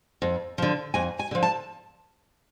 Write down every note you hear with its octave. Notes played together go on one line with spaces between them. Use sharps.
F2
D3 F3
F2 G#5
G#5
D3 F3
A5